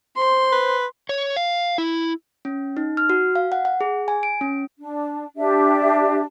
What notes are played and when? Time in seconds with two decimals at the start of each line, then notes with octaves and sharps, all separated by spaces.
0.16 C5 C6
0.52 B4
1.09 C#5
1.36 F5
1.78 E4
2.45 C#4
2.77 D#4
2.97 F6
3.10 F#4
3.35 F5
3.52 F#5
3.65 F#5
3.81 G#4
4.08 G#5
4.23 D7
4.41 C#4
4.79 D4
5.37 D4 G4 E5